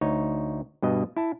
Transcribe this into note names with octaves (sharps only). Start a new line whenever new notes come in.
D2 D#4 C#5
G2 B2 D#5
E4 A5